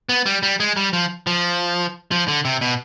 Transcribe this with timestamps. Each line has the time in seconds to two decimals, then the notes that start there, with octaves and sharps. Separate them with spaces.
0.09 B3
0.26 G3
0.43 G3
0.60 G#3
0.76 G3
0.93 F3
1.27 F3
2.11 F3
2.28 D3
2.45 C3
2.61 B2